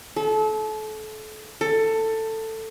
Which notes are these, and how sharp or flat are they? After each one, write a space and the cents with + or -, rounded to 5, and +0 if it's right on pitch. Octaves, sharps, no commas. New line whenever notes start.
A4 -30
A4 +15